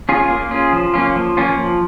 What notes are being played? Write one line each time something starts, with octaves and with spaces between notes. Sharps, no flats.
C#4 F4 G#4
A#3
C#4 F4 G#4
F3
A#3 C#4 F4
F3
A#3 C#4 F4
F3